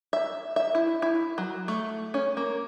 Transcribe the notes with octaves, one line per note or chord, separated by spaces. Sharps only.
E5
E5
E4
E4
F#3
A3
C#4
A#3